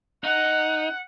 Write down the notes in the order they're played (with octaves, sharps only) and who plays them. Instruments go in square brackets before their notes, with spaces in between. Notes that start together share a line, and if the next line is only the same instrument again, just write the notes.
[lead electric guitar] D#4 [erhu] F#5